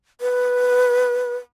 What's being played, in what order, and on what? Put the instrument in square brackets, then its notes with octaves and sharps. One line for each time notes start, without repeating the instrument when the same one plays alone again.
[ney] B4